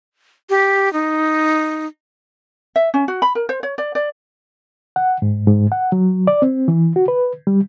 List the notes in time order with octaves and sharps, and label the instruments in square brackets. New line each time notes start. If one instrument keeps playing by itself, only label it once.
[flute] G4
D#4
[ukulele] E5
C#4
F#4
B5
A#4
C5
C#5
D5
D5
[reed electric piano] F#5
G#2
G#2
F#5
F#3
D5
C4
E3
F#4
B4
G3